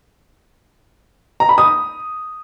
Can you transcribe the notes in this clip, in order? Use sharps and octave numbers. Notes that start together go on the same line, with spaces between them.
A#5
B5
D#6